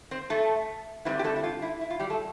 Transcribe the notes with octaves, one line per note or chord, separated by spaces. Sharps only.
C4 C5
A3 A4
D3 G3 B3 C4 E4 B4
G4
A3 A4
E4
F4
E4
E4
F4
G3 G4
A3 A4